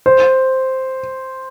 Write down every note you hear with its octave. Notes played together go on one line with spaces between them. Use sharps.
C5